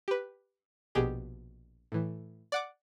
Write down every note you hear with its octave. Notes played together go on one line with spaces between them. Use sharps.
G4 B4
A#1 B2 G4 G#4
A2 E3
D5 F#5 D6